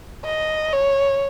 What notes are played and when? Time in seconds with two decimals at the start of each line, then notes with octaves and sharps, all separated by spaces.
0.25 D#5
0.72 C#5